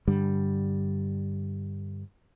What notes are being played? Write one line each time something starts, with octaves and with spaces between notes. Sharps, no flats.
G2 D3 G3